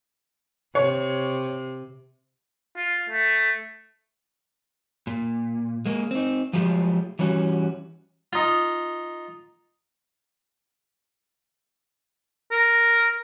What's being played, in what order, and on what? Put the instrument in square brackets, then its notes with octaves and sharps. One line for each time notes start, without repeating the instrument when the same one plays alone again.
[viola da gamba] C3 [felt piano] C#5
[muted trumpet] F4
A3
[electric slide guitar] A#2
G#3 A#3
C4 D#4
F3 F#3 G#3 A3 F4 G4
E3 G3 C#4 F#4
[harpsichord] D#4 F4
[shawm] A#4